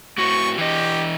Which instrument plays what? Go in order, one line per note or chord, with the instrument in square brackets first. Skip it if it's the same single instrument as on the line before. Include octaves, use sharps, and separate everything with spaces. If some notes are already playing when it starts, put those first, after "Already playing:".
[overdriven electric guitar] A2 F#4 [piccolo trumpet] C#6
[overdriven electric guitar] E3 D#5 [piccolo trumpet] G4